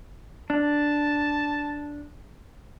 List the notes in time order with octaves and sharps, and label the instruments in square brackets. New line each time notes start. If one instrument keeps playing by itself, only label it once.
[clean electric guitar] D4 [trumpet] A5